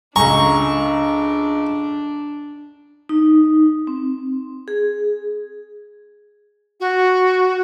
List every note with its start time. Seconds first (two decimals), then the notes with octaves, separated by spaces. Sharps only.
0.16 C#2 D4 A4 G#5 A#5 C#6
3.09 D#4
3.87 C4
4.68 G#4
6.80 F#4